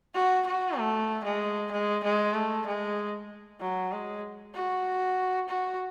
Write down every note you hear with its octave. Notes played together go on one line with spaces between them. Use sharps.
F#4
F#4
A3
G#3
G#3
G#3
A3
G#3
F#3
G#3
F#4
F#4